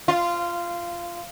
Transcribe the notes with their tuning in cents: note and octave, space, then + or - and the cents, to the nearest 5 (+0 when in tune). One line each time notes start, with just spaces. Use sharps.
F4 -15